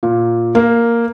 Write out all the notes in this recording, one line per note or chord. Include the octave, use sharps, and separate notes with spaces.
A#2
A#3